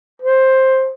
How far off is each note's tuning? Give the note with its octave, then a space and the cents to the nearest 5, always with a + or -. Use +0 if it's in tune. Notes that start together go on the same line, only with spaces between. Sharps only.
C5 +10